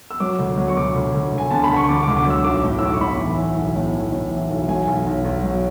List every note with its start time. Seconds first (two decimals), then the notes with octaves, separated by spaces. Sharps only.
0.11 E6
0.20 F#3 D6
0.39 D2
0.57 F#3
0.68 C#6
0.77 D2 D6
0.96 D2
1.14 D2
1.32 D2
1.38 G#5
1.51 D3 A5
1.64 B5
1.69 D2
1.76 C#6
1.89 D3 D6
2.03 D6
2.08 D2
2.17 D6
2.26 F#3 E6
2.44 B1 D6
2.64 A2
2.79 E6
2.82 B1 D6
2.94 C#6
3.00 A2 B5
3.19 E3
3.37 E3
3.57 B1
3.76 A2
3.94 E3
4.12 A2
4.31 E3
4.50 B1
4.68 F#3 G#5
4.87 B1
5.07 B1
5.24 B1
5.43 F#3